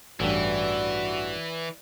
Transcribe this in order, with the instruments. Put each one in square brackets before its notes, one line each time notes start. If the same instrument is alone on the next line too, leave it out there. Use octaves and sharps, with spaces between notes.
[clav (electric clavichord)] A1 G2 [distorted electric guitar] E3 [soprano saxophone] F#4 [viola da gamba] D5